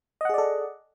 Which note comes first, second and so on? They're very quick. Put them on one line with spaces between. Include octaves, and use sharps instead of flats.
D#5 F#5 G#4 D5 A4